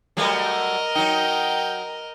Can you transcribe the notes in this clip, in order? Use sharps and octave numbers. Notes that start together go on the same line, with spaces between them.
F#3 G3 A3 A#4 D#5
F#3 D#4 G5